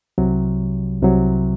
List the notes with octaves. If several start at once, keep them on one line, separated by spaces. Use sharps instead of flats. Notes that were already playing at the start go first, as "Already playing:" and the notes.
C2 C3 F#3
C2 C3 F#3